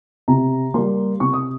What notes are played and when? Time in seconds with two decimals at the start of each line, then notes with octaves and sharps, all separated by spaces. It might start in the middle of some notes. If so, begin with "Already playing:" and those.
0.28 C3 A#5
0.74 G3 A#3 C6
1.20 C3 C#6
1.33 D#6